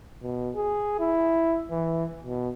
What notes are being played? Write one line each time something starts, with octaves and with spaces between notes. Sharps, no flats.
B2
G#4
E4
E3
B2